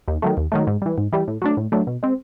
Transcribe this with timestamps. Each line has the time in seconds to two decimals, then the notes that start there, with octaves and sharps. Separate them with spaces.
0.08 D#2
0.22 D#3 F#3 A3
0.37 D#2
0.52 D#3 F#3 A3
0.67 G#2
0.82 E3 G3
0.98 G#2
1.13 E3 G3
1.28 A2
1.42 F#3 A3 D4
1.57 A2
1.72 F#3 A3 D4
1.87 B2
2.03 G#3 C4